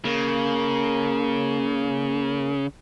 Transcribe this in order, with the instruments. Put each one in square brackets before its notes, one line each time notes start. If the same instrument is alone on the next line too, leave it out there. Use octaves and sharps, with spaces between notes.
[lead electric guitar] C#3 [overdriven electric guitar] A#3